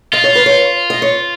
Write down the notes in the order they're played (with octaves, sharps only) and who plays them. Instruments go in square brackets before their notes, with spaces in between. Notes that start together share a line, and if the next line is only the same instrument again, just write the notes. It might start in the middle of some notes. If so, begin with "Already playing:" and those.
[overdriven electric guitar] F4 [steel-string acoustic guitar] D#5
[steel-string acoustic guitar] C#5
B4
C#5
D#5
C#5